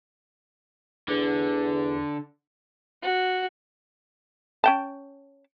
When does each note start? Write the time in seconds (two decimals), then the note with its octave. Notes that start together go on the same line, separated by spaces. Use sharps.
1.09 E2 D3
3.02 F#4
4.64 C#4 G5 A5